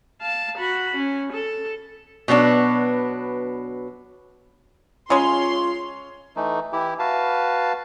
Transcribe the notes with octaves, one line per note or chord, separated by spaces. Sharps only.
F5 A5
F#4 B5
C#4
A4
B2 F#3 B3 D4
C#3 G#3 C#4 F4 C#5 C6
E3 A3 D#4
E3 E4 G4
F#4 B4 F5 A5